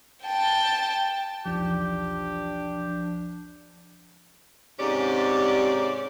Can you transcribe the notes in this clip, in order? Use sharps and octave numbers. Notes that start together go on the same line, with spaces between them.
G5 A5
B1 E2 F3 D4 G4
G#2 C3 C#4 G4 D5